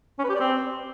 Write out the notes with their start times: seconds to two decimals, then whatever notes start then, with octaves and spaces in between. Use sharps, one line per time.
0.19 C#4
0.24 B4
0.29 G4
0.35 D5
0.40 C4